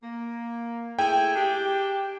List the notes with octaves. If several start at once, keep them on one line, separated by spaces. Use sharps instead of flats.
A#3
A3 E4 G#4 G5
D4 G4